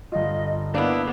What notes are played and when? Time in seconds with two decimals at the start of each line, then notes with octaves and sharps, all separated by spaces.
0.12 G1 F4 D#5
0.75 A#3 B3 D4 E4 F5